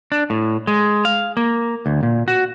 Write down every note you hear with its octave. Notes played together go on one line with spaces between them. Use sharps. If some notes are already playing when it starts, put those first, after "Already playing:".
D4
A2
G#3
F5
A#3
D2
A#2
F#4